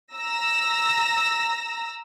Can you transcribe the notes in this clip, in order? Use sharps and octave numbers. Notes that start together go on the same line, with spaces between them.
A#5 E6 A#6